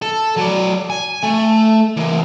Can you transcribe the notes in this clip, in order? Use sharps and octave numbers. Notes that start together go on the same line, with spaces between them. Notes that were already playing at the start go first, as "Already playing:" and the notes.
A4
F#3 D5
G#5
A3
E3 A#3